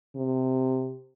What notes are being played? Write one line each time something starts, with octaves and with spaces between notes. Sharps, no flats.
C3